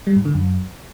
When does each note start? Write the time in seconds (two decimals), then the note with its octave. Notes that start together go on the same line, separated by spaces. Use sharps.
0.07 G3
0.16 G#2
0.25 D3
0.34 F#2